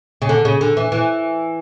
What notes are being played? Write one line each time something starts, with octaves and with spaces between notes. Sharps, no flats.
C#3
D3
C#3
D3
E3
E3